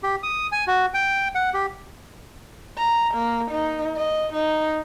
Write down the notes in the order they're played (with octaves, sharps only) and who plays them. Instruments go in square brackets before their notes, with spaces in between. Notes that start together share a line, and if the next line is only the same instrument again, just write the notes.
[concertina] G4
D#6
G#5
F#4
G5
F#5
G4
[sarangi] A#5
A#3
D#4
D#5
D#4